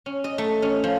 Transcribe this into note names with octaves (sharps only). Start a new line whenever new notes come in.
C#4
D#5
A3
C#4
F3